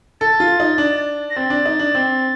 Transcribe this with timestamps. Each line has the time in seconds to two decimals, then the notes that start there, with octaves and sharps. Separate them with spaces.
0.21 A4 A6
0.40 F4
0.60 D#4
0.78 D4
1.30 A#6
1.36 C4 A6
1.50 D4
1.66 D#4
1.79 D4
1.95 C4